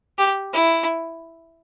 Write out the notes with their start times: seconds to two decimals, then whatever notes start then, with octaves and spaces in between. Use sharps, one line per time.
0.18 G4
0.53 E4